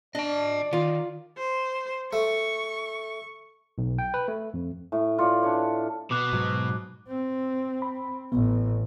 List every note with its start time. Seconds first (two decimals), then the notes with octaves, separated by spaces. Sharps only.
0.15 D4 D5 D#5 A5
0.73 D#3 F4
1.38 C5
2.13 A3 C#6
3.78 B1
3.99 G5
4.14 B4
4.28 A3
4.54 F2
4.92 A2
5.18 F4 C#5 D5
5.43 D4 C#5
6.11 B2 D6 F#6 C7
6.33 G#2 F#3
7.08 C4
7.82 B5
8.32 A1 B3